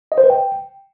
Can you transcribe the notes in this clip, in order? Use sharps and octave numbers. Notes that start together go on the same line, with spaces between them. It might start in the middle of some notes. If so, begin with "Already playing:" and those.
D#5
C5
B4
G5